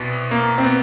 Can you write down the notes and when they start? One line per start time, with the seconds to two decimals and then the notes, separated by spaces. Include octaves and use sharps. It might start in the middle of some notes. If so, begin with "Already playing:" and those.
Already playing: C2 B2 B3
0.31 A#3
0.58 C4
0.64 B3